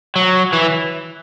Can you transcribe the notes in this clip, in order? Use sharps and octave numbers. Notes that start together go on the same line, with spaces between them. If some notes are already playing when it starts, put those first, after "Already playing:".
F#3
E3